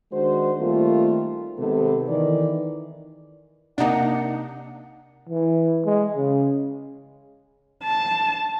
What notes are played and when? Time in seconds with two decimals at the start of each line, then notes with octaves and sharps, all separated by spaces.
0.12 D#3 G#3 D4 F#4 C5
0.58 D#3 G3 A3 A#3 C4 F4
1.58 C3 D#3 G#3 B3 A4
2.08 D#3 E3 D5
3.78 C3 A#3 D4 D#4 F#5
5.29 E3
5.86 G#3
6.17 C#3
7.83 A5